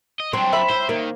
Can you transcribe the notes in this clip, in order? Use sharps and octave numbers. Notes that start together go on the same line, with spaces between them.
D#5
F#3 C4 D4
E5 B5
E4 C5
D#3 A#3